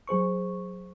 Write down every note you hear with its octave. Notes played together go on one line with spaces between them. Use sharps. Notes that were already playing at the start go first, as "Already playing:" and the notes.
F#3 G#4 C5 C#6